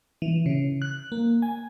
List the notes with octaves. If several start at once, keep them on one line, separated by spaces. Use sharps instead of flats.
E3
C#3
F#6
A#3
G#5